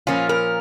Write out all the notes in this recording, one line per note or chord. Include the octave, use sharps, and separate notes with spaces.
A#2 F3 A#3 C#4 F4
A#4